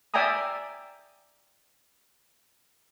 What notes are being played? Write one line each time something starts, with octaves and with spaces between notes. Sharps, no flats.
D5 E5 G5 G#5 A#5 D#6